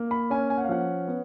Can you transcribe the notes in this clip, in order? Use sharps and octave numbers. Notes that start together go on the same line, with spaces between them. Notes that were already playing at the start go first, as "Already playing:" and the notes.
Already playing: A#3
B5
C#4 G#5
G#5
F#5
F5
F3 F#5
B3